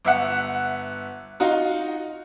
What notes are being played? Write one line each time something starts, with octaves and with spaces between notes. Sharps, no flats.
G1 E5 F#5
D#4 F4 F#4